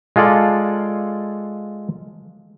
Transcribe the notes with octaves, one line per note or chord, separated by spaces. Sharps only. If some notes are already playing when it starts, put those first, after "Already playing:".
G#3 F4 A4 D5 F5